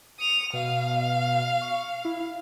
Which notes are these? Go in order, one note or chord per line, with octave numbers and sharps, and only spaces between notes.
D#6 C#7 F7
B2 F5
C#6
E4